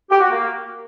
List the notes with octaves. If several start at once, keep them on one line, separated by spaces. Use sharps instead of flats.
G4
F#4
A#3